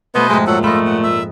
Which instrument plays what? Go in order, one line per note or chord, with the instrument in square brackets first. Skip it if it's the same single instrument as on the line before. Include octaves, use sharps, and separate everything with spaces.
[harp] B2 A3 [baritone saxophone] B3 [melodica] B4 C5 D#5
[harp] F2 G#2 A3 [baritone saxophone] G#3
[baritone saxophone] A#2 [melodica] F#3 A4 F#5
[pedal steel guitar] A3 [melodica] F4 A4 [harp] D#5 B5
[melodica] F#5
E5 E6